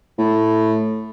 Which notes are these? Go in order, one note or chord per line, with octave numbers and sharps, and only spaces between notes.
A2